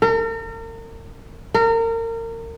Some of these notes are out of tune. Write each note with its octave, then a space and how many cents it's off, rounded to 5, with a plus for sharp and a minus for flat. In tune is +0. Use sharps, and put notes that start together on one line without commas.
A#4 -40
A#4 -30